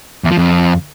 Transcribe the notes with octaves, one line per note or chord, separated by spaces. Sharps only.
E2
F3
F2